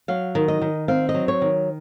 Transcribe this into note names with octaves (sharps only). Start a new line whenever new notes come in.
F#3 F5
D#3
D#5
D#3
C4 F5
D#5
F#3
C#5
D#3